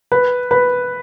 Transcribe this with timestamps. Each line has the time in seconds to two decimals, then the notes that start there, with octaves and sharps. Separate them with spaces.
0.12 B4
0.51 B4